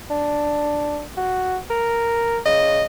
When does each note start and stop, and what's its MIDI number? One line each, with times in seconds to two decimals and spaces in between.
0.10 1.02 62
1.17 1.57 66
1.70 2.38 70
2.46 2.83 49
2.46 2.85 75